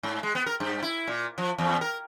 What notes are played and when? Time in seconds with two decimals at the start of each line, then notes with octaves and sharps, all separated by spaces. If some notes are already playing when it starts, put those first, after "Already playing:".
0.03 G#2
0.23 G#3
0.35 B3
0.46 A#4
0.60 G2
0.82 E4
1.07 A#2
1.38 F3
1.58 E2
1.81 A#4